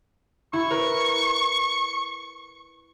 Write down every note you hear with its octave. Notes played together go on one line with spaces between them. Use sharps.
E4 C#6
A#4 B4